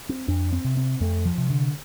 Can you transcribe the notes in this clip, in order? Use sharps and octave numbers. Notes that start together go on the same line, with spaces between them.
C4
F2 D4
C4
C3
C4
F2 A3
F3
C3
D3